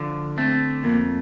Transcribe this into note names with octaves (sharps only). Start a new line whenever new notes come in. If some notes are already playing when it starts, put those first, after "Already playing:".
Already playing: D3 F3
A3 C4
F2 A#3